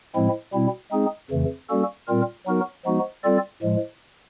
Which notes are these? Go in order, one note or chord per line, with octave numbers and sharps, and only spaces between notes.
A2 F3 G#3 C4 E4
B2 G3 C4 E4
G#3 C4 D#4 G#4
F2 C#3 E3 A3
G3 A#3 C#4 F#4 A4
A#2 G3 C4 F4 A#4
F#3 B3 D#4 F#4 A#4
F3 G#3 B3 D#4 F#4
G3 C4 F4 A4 D5
A2 F3 G#3